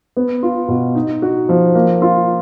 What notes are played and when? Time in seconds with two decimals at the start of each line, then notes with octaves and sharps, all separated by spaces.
0.17 B3
0.43 F4
0.68 B2
0.95 D#4
1.22 F#4
1.49 F3
1.75 A#3
2.02 F4